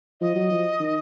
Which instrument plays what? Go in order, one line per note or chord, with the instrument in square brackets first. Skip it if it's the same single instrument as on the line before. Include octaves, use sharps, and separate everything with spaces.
[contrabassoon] F3 [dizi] D#5
[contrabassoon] F#3
F3
D#3